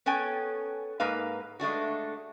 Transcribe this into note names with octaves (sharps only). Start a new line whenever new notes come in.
B3 C#4 A4 G5 G#5
G#2 A#3 B4 F5
G#3 A3 D4 F#4